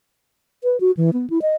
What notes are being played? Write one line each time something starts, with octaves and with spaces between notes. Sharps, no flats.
B4
F#4
E3
B3
E4
D#5